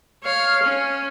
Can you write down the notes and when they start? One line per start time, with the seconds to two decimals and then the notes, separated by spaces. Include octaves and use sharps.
0.24 C#5 F5
0.63 C#4